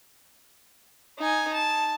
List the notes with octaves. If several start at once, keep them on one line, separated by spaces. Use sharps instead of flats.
D#4 G#5
A5